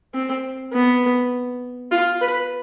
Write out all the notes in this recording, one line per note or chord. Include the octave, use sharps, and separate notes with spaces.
C4
B3
F4
B4